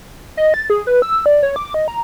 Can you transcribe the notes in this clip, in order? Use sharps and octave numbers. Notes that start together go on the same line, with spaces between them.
D#5
A6
G#4
B4
E6
D5
C#5
D6
D#5
A#5